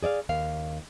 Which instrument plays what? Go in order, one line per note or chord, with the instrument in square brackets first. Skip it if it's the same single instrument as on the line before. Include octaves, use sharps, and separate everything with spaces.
[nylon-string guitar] G#4 D5 D#5 F5
D#2 A#4 F5